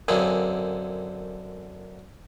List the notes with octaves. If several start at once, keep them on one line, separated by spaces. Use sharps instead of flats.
F#2 D3 A#3 C4 G#4